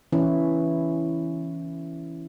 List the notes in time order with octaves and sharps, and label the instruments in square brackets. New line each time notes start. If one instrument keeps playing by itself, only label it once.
[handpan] E3 C#4 E4